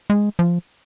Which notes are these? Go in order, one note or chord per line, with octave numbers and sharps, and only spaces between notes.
G#3
F3